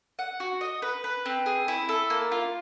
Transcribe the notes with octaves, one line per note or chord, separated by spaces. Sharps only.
F#5
F#4
D#5
B4
B4
C4
G#4
E4
A4
A#3
F4